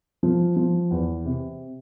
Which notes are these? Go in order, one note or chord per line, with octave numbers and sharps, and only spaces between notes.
F3
F3
E2
C3